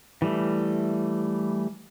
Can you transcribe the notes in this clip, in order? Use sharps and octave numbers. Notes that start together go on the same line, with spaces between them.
E3 G3 A3